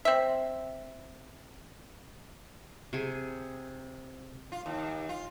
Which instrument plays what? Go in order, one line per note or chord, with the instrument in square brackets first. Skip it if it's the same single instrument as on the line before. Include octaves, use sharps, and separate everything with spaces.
[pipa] C4 E5
[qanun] C3 G#4
[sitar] F4
D#2
F4